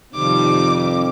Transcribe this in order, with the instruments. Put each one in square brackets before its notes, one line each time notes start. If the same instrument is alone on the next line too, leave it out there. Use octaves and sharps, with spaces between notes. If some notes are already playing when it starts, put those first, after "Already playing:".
[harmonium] F2 [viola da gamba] C3 D#3 G3 [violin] D6